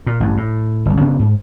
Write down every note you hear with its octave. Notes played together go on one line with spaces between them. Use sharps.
A#2
A1 G2
A2
G1 C2
C#3 B3 C#4 D4
G#2